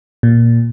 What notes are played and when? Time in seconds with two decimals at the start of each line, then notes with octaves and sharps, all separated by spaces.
0.23 A#2